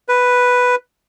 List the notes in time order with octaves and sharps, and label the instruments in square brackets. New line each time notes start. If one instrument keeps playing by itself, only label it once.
[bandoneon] B4